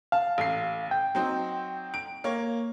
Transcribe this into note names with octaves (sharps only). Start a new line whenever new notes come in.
F5 A5
A1 C7
G5
F#3 C4 D#4
D7
A#3 C#5